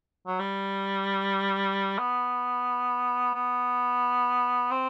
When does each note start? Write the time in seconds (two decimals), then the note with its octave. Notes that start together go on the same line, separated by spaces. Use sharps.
0.27 F#3
0.39 G3
1.99 B3
3.34 B3
4.71 C4